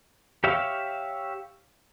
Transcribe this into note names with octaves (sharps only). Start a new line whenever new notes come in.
G4 C#5 E5 F5